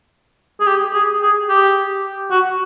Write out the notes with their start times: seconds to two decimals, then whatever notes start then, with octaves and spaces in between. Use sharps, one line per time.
0.60 G#4
0.67 G4
0.94 G#4
1.22 G#4
1.49 G4
2.31 F#4